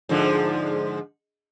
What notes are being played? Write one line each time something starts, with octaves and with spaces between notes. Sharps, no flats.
G#2 D3 F3